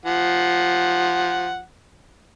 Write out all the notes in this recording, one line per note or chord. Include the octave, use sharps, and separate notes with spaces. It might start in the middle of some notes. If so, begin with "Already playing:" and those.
F3 F#5